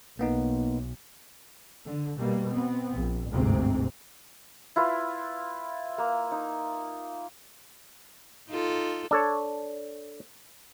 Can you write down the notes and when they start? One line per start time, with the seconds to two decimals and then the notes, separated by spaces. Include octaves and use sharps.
0.19 B1 A#3 B3 D#4
1.85 D3
2.17 B2 G3 A#3
2.49 B3 C4
2.94 A#1
3.32 G1 D2 G#2 C3 C4
4.76 E4 F4 B4
5.98 A#3
6.32 D#4
8.48 D#4 F4 A4
9.11 D4 A4 C#5